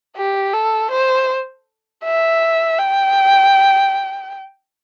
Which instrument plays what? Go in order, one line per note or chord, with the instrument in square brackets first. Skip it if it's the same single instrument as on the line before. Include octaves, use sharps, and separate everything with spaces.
[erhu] G4
A4
C5
E5
G5